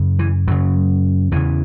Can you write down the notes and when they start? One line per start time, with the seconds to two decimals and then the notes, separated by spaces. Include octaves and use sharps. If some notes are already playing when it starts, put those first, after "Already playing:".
Already playing: F#2 C#3
0.19 E3
0.48 F#2 C#3 F#3
1.32 E2 C#3 E3